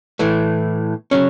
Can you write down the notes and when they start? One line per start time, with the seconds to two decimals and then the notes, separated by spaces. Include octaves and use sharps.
0.19 A2 E3 A3
1.11 C#3 F#3 C#4